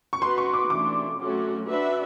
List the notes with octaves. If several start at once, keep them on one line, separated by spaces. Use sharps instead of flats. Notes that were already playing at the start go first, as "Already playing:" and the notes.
C#6
B3 D#4 F#4 B4 C6
C#6
D6
E3 A3 D4 D6
F#3 A3 C#4 F#4
D4 F#4 B4 E5